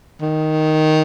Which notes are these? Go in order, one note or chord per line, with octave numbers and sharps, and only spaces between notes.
D#3